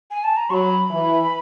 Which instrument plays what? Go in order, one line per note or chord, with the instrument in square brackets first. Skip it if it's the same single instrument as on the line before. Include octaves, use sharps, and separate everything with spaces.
[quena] G#5
A5
A#5
[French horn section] F#3 [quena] C#6
[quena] B5
[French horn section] E3